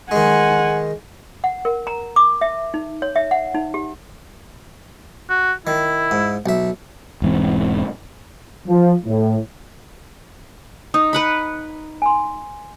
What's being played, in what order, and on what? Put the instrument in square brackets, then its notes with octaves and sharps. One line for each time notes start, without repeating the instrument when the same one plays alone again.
[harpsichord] D#3 G#3 [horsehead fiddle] F#5 G#5
[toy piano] F#5
A#4
A#5
D6
E5
D#4
C#5
E5
F#5
D#4
G4
[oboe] F#4
[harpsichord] D#3 [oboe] E4
[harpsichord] G#2
B1 E5
[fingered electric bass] E1 G#2 E3 C4
[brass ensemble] F3
A2
[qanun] D#4 [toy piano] D#6
[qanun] B4 F#5 B5
[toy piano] G#5 C6